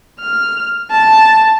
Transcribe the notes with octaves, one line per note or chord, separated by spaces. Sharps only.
F6
A5